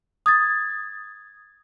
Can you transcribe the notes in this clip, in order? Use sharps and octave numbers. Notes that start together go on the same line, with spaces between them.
D#6 G#6 A6